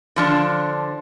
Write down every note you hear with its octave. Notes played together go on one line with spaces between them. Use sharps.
D3 F3 D4